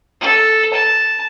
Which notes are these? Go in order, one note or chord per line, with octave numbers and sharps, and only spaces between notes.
A4
A5